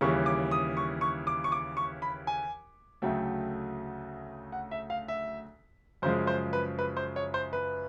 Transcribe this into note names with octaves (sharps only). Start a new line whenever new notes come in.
D#2 C#3 E3 G3 C#6
D6
D#6
C#6
C#6
D6
C#6
D6
C#6
B5
G#5
D2 C#3 F#3 A3 G5
F#5
E5
F5
E5
F#2 C#3 F3 G#3 C5
C5
B4
B4
C5
C#5
C5
B4